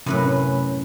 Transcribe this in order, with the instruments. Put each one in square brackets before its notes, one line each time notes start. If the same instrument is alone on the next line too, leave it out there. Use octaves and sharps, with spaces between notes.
[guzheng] F#2 A2 B4 [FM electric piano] C3